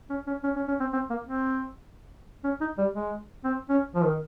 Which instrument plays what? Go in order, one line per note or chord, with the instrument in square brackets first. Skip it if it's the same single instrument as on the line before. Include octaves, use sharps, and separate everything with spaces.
[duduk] C#4
C#4
C#4
C#4
C#4
C4
C4
A#3
C4
C#4
D#4
G3
G#3
C4
C#4
F3
D#3